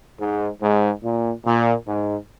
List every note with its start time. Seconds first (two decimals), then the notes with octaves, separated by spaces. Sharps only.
0.19 G#2
0.61 G#2
1.03 A#2
1.44 A#2
1.86 G#2